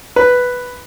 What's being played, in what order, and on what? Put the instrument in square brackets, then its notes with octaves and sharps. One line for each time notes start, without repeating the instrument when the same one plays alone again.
[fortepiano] B4